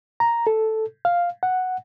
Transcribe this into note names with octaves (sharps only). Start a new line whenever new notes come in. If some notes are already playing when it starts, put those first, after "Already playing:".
A#5
A4
F5
F#5